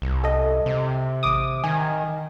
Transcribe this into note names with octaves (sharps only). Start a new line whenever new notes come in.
C2
A4 D#5
C3
A1 D6 D#6
D#3 G#5